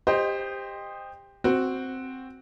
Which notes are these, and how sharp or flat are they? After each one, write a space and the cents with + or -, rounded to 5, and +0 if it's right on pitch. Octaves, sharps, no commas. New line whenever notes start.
G4 +20 C5 +0 D#5 -5
C4 +0 F#4 +0